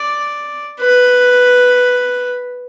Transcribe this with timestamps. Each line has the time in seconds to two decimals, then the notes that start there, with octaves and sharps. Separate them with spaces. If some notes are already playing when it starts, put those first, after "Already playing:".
Already playing: D5
0.80 B4